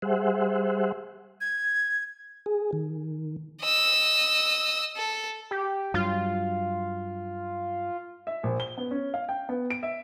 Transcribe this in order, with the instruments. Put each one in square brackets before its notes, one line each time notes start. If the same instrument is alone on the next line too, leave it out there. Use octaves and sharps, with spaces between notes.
[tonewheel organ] G3 G#4 C5 E5 F#5
[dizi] G#6
[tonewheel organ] G#4
D#3
[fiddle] D#5 E6
A4
[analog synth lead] G4
[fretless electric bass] G2 F#3 [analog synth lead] F4
[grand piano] E5
A#1
G7
B3
C#4
F5
G5
B3
D7
E5